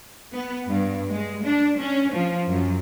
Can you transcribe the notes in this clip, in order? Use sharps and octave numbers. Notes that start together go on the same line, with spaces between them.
B3
G2
G#3
D4
C#4
F3
F#2